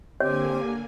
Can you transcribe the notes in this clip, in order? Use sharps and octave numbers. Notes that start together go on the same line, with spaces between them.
D3 A#3 C4 G4 C#5 G#5